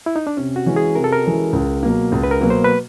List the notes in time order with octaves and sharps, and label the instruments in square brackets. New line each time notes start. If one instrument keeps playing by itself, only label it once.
[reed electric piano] E4
D#4
D4
[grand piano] C3 [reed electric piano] C#4
[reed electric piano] F#4
[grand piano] E3 G#3 C#4
[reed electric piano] G#4
[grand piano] C3 [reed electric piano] A#4
[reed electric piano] A4
A#4
[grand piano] E3 G#3 C#4
C#2
B2 F#3 A#3
C#2
[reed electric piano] B4
A#4
[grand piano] B2 F#3 A#3
[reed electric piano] C5
B4